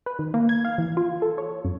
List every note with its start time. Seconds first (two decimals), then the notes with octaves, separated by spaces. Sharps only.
0.06 B4
0.19 D#3
0.34 A#3
0.49 G#6
0.65 F5
0.78 E3
0.97 F4
1.22 A4
1.38 C#5
1.65 F#2